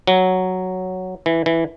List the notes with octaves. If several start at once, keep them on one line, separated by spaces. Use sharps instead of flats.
F#3
E3
E3